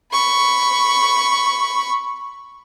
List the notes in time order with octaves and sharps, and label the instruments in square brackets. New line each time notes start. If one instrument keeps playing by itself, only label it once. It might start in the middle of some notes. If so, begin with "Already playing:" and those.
[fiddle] B5 C#6